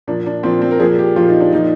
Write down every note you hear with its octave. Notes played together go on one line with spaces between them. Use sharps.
A#2 F3 D4
D4
A#2 F3 C4
C4
A#4
A#2 F3 G#4
G4
A#2 F3 F4
D#4
D4
A#2 F3 D#4